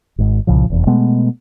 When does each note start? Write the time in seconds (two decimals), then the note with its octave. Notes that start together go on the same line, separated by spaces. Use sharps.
0.18 G#1 G#2
0.47 C2 A#2 C#3 F3
0.70 F1 E2
0.86 B2 G#3 A3 B3